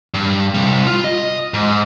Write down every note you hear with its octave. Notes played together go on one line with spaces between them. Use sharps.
G2
C3 G3
F4
D#5
G#2